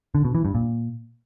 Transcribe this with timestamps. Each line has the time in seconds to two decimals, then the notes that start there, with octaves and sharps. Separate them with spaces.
0.15 D3
0.25 B2
0.35 E3
0.45 G2
0.55 A#2